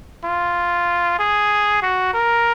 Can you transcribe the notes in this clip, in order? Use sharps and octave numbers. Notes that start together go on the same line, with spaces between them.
F4
G#4
F#4
A#4